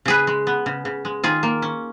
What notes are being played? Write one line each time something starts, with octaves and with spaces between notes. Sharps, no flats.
C#3 G#4 B4
G#3
B3
C#3
C#3
G#3
D#3 F4 G#4
A#3
C#4